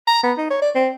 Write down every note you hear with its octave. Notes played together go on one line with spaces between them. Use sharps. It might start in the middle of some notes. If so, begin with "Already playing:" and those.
A#5
B3
D#4
C#5
D5
C4